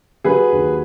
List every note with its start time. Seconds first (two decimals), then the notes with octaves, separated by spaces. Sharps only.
0.24 F#3 G#4 B4
0.52 D#2